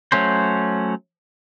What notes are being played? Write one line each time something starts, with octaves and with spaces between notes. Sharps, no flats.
F#3 A3 C#4 C5